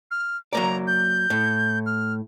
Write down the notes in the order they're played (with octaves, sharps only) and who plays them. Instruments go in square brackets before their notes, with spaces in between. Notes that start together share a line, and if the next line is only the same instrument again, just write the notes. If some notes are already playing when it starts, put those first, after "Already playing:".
[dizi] F6
[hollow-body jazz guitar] F#3 A#3 D5 [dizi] A#5
[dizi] G6
[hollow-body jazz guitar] A2
[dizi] F6